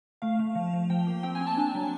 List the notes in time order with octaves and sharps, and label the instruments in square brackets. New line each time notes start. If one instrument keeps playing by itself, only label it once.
[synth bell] A3 F5
A3
F3
F3
F3 G5
A#3
C4 G5
G#5
C4
A5
D4 G#5
F#3